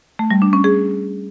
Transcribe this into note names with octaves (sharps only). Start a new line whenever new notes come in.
A3
G3
D4
C#4
G#4